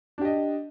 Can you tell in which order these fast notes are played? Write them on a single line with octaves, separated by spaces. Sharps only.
D4 G4 D#5